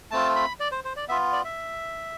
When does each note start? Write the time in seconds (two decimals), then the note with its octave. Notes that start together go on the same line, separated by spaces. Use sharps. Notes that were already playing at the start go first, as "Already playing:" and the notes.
0.11 A3 C4 F4 A5
0.36 B5
0.60 D5
0.72 C5
0.85 C5
0.96 D5
1.08 B3 F4 E5
1.32 D5
1.45 E5